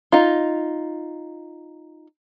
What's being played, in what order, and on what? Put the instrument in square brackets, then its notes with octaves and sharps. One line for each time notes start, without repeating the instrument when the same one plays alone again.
[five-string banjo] D#4 F4